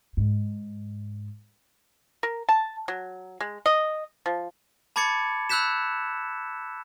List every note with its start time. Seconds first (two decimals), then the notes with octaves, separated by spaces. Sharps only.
0.17 G#2
2.23 A#4
2.49 A5
2.88 F#3
3.40 G#3
3.66 D#5
4.26 F3
4.96 A5 B5 D6 G#6 A6 C#7
5.49 B5 E6 F#6 G6 B6 E7